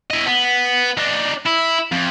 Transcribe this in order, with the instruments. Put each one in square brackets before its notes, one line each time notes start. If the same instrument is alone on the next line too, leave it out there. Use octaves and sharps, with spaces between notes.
[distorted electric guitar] E4 D#5
B3
D4 D#4
E4
F2